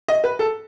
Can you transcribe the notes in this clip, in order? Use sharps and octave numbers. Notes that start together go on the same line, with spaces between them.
D#5
B4
A4